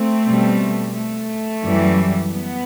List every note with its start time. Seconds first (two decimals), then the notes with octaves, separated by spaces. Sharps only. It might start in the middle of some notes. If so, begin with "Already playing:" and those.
Already playing: A3 C4
0.25 B2 G3
0.95 A3
1.63 F#2 E3 G3
2.32 B3